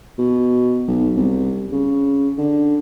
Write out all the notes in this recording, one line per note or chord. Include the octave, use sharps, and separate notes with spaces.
B2
B1
C2
C#3
D3